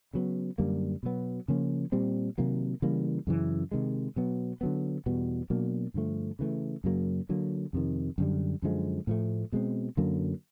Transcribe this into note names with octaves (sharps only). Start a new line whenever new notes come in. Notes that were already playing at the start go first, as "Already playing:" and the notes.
C#3 F#3 B3
F#2 D3 G3 A#3
B2 F#3 B3
C#3 F3 A#3 C#4
A#2 G3 C4
C3 D#3 F#3 A#3
C#3 E3 G3 A#3
F#2 C#3 E3
C3 D#3 G#3
B2 F#3 B3
D3 F#3 B3
E2 B2 G3 B3
B2 F#3 A#3 D4
G2 D3 F3 A3
C#3 E3 A3
F#2 C#3 F#3 A#3
D3 F#3 A#3
F2 C3 D#3
F#2 D3 G3
F#2 D3 F3 G#3
A2 F3 A3
B2 G#3 C4
F#2 D3 F#3 A#3